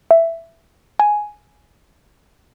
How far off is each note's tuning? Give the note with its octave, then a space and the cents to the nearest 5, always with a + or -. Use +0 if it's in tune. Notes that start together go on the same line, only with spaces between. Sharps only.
E5 +10
G#5 +10